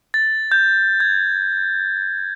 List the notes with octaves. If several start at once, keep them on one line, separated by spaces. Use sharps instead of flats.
A6
G6
G#6